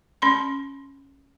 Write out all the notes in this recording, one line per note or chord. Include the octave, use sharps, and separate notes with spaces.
C#4 B5 C6